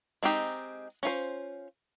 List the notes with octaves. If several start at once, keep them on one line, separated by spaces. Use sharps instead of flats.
G#3 C4 D#4 G4
C#4 F4 C5